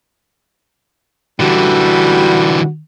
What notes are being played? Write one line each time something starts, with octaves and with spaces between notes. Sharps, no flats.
D3 E3 G3 F#4